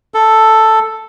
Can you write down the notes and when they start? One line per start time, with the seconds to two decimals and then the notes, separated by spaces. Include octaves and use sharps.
0.14 A4